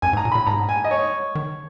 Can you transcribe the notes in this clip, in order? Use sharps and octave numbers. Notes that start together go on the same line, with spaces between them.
F#2 G#5
G#2
A#5
A#2
B5
A#2
G#2 A#5
G#5
D#5
C#5
D#3